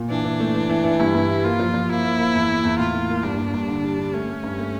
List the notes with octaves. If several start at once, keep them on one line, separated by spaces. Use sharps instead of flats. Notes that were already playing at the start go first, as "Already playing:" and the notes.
Already playing: A#2
E3 D4
E3
A3
E3
E3
E3
G2 E4
G2
G3
A#3 F4
F3
F3
A#3 E4
A#3
A#3
E2
E2
E2
A2 F4
A2
A#3
G2 D4
G2
G2
D3
G3
G3
A3 C#4
A3
G2
A3